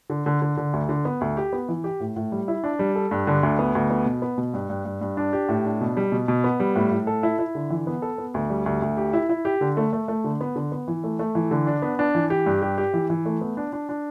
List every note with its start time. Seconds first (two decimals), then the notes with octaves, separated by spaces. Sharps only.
0.10 D3
0.26 D3
0.42 D3
0.57 D3
0.73 D2
0.89 D3
1.05 B3
1.21 D2
1.37 G4
1.53 B3
1.69 E3
1.84 G4
2.00 A2
2.16 A2
2.32 G3
2.48 E4
2.64 D4
2.79 G3
2.95 A4
3.11 G2
3.27 D3
3.43 D2
3.59 B3
3.75 D2
3.90 B3
4.06 B2
4.22 B3
4.38 B2
4.54 G2
4.70 G2
4.85 G2
5.01 G2
5.17 D4
5.33 G4
5.49 A2
5.65 D4
5.81 B2
5.97 G3
6.12 B2
6.28 B2
6.44 B3
6.60 G3
6.76 A2
6.91 A2
7.07 A4
7.23 E4
7.39 E4
7.55 D3
7.70 E3
7.87 B3
8.02 A4
8.18 B3
8.34 D2
8.50 G3
8.66 D2
8.82 D2
8.97 G4
9.13 E4
9.29 E4
9.45 G4
9.61 D3
9.77 A3
9.93 A3
10.08 A3
10.24 D3
10.41 B3
10.56 D3
10.72 B3
10.88 E3
11.04 A3
11.19 A3
11.35 E3
11.51 D3
11.67 D4
11.82 B3
11.99 D4
12.15 E3
12.30 G4
12.46 G2
12.62 G4
12.78 G4
12.93 E3
13.10 E3
13.25 A3
13.41 B3
13.57 D4
13.73 D4
13.89 D4